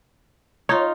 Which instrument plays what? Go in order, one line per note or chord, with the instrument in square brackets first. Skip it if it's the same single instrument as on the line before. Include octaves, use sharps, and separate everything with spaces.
[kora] D#4 F4 [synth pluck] C#5